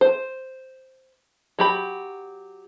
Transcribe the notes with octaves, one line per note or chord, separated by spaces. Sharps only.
C5
F#3 G4 B5